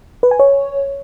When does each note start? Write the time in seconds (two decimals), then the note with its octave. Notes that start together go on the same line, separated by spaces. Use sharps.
0.23 B4
0.31 G#5
0.39 C#5